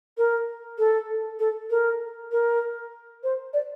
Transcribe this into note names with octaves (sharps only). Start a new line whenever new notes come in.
A#4
A4
A4
A#4
A#4
C5
D5